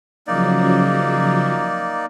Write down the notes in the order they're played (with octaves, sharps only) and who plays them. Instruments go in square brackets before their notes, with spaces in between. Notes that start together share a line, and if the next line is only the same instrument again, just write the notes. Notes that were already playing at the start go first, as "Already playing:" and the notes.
[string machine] C#3 F3 F#3 [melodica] A#3 D#4 D5